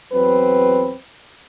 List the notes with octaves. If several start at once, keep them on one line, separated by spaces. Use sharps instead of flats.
E2 F#3 C4 B4